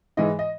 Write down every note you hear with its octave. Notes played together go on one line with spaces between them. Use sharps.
G#2 E3 G#3 D#5
D#5